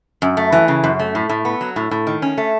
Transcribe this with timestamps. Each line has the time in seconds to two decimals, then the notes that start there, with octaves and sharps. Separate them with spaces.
0.22 F#2
0.37 A3
0.52 E3
0.68 C#3
0.84 F#2
0.99 A3
1.15 A2
1.29 A2
1.45 B3
1.61 F#3
1.76 A2
1.91 A2
2.07 D#3
2.22 C#4
2.38 A3